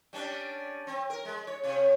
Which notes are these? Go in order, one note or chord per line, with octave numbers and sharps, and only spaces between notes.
G3 C#4 D4
C4
A#4
G#3
C#5
C3 C#5